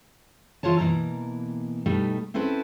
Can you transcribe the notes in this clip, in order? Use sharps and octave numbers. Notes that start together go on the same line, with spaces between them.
E3 F#3 F4 C5 C#5 A5
B2 E3 A#3 A#5
B2 G3 A3 D#4
C4 C#4 E4 A4 B4 C5